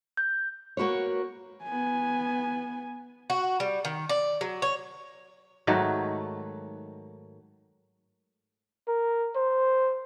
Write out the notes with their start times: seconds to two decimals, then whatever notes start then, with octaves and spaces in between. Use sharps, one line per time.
0.17 G6
0.77 A#3 F#4 B4 C#5
1.64 B3 G#5
3.30 F#4
3.60 G3
3.85 D#3
4.09 D5
4.41 F#3
4.62 C#5
5.67 G#2 D#3 F#3 A3
8.88 A#4
9.36 C5